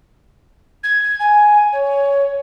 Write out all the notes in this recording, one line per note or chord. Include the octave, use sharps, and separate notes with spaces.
G#6
G#5
C#5